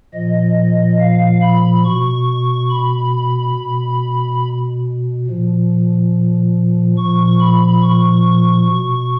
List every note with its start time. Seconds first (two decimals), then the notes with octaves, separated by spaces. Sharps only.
0.14 A#2 F3 D#5
1.00 F5
1.42 B5
1.84 B2 C#6
2.69 B5
3.55 B2
5.27 A#2 F3
6.97 A#2 F3 C#6
7.40 B5
7.82 C#6
8.67 B2